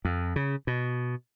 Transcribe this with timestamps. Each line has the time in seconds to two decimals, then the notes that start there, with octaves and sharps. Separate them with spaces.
0.05 F2
0.36 C#3
0.67 B2